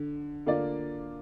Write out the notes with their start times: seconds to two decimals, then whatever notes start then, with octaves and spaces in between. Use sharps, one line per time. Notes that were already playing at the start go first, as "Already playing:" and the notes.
Already playing: D3
0.46 D3 A#3 F4 D5